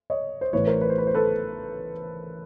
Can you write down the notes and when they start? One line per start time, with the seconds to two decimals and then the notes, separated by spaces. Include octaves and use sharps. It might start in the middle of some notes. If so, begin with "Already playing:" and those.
0.10 C#5 D#5
0.41 C5
0.53 A1 A2 E3 A3 B4 C#5
0.67 A#4 C5
0.81 B4
0.90 C5
0.98 B4
1.07 C5
1.14 A4 B4